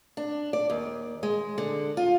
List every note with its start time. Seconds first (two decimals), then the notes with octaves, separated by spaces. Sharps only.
0.17 D4
0.53 D5
0.70 D#2
1.23 G#3
1.58 D3
1.97 F4